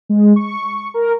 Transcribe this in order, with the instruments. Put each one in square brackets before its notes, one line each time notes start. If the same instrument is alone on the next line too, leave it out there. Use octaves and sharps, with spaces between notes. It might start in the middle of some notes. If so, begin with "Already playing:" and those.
[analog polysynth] G#3
C#6
A#4